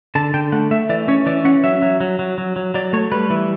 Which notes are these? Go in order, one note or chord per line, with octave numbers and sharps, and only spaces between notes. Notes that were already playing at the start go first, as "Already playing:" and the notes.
D3 A5
D3 G5
A3 F#5
A3 E5
E3 D5
C#4 C#5
E3 D5
C#4 F#5
F#3 E5
F#3
F#3
F#3
F#3
F#3
F#3 D5
A3 C#5
G3 B4
E3